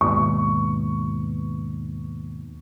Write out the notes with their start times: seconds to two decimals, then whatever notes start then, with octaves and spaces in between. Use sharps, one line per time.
0.01 D#2 G#2 B2 C#6